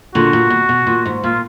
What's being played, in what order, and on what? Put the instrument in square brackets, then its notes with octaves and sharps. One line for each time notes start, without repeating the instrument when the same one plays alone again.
[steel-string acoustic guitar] A#2 D3 [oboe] F#4
[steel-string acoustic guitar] A#2
B2
B2
A#2
G#2
[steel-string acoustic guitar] A#2 [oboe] F4